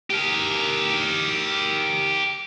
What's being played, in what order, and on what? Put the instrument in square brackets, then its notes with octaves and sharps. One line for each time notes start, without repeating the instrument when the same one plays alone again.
[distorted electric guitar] G4 A#4